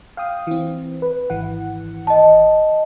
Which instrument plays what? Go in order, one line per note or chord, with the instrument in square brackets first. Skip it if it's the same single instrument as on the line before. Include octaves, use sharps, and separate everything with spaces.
[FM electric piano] F5 G5 D#6
E3 C4
B4
G#1 E3 F#5
[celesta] D#5 A5